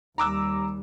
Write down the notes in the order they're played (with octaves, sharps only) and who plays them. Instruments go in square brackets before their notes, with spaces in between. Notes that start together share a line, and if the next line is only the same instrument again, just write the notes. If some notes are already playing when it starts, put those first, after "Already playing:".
[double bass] D#2 G3 [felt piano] A#5 D6 E6